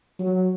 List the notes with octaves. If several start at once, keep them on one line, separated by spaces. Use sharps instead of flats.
F#3